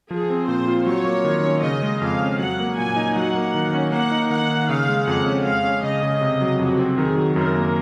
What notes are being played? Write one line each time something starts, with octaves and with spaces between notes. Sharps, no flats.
F3 G#4
C4
A#2 C5
F4
F#3 C#5
A#3
D#3
C#4
C#3 D#5
G#3
F2 F5
C#4
F#3 F#5
A#3
A#2 G#5
D#4
F#3 F#5
A#3
D#3
C#4
A#3 F#5
D#4
D#3 F#5
D#3
C#3 F5
G#3
F2 F#5
C#4
G#3 F5
C#4
C#3 D#5
C#3
C3
F#3
F2 F#4
C4
D#3 G#4
F#3
F#2 A#4
A#3